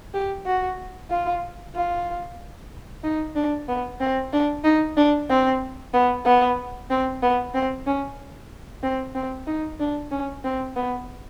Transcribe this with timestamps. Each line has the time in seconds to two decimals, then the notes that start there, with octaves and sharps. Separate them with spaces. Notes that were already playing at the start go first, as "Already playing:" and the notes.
0.14 G4
0.46 F#4
1.10 F4
1.75 F4
3.03 D#4
3.36 D4
3.68 B3
4.00 C4
4.33 D4
4.64 D#4
4.97 D4
5.29 C4
5.93 B3
6.25 B3
6.90 C4
7.22 B3
7.54 C4
7.86 C#4
8.83 C4
9.15 C4
9.47 D#4
9.80 D4
10.11 C#4
10.44 C4
10.76 B3